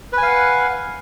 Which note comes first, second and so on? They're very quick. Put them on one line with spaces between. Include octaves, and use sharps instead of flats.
B4 G#5 F5 F#5